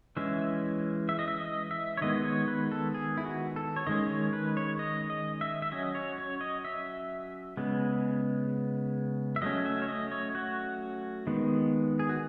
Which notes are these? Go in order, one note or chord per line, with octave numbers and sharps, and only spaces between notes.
E3 G#3 C#4 E5
E5
D#5
E5
D#5
E5
C#5
D#3 G#3 B3 D#5
C#5
B4
A4
G#4
E4
F#4
A4
C#5
D#3 G#3 C#4 D#5
C#5
B4
C#5
D#5
D#5
E5
E5
F#3 C#4 D#5
C#5
C#5
D#5
E5
C#3 G#3 B3
E5
F#3 A3 C#4 D#5
E5
C#5
D#5
C#5
F#4
D#3 G#3 B3
G#4
F#4